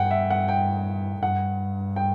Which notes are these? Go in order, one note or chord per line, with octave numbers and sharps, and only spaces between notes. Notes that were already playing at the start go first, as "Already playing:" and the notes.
Already playing: G2 F#5 G5
E5
F#5
G5
G2 F#5
G5